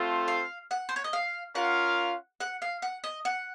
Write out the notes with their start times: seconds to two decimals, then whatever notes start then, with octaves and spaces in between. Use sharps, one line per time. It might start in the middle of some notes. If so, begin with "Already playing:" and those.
Already playing: A3 C4 F4 A4 C5
0.28 F5
0.71 F#5
0.89 C5
0.96 C#5
1.04 D#5
1.13 F5
1.55 C#4 F4 A#4 F5 F#5
2.40 F#5
2.62 F5
2.82 F#5
3.04 D#5
3.25 F#5